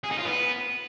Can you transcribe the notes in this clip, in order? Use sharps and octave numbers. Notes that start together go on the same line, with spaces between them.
G#4
D#4
F4
B3